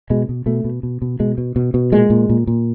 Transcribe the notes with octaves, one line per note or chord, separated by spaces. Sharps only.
B2 G#3
B2
B2 A3
B2
B2
B2
B2 G#3
B2
B2
B2
A#2 G#3
A#2
A#2
A#2